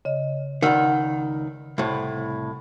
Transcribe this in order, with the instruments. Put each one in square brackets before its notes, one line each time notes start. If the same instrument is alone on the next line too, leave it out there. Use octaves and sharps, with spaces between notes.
[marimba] C#3 D#5
[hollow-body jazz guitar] C#2 D#3 [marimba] D5 F#5 E6
[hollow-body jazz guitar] C2 A2